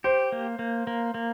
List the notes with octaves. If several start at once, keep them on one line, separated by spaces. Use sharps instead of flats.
G4 C5
A#3
A#3
A#3
A#3